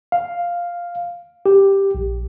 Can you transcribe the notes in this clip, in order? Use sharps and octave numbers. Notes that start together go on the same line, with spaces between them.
F5
G4
A#1